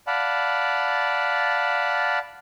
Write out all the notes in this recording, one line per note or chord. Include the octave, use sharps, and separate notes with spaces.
D5 F5 F#5 A5 B5